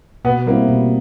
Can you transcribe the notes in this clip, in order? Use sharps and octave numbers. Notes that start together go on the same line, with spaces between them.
B2 B3
G3 A#3 C4 E4
B2